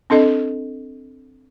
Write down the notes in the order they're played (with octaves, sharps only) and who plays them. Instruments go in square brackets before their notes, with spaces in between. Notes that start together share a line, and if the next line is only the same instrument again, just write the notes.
[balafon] C4 D4 A4 D#5